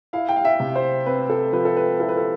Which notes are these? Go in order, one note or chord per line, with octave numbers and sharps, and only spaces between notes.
E4 F5
G5
F5
E5
C3
C5
C4 B4
A4
F3 B4
A4
B4
E4 A4
B4
A4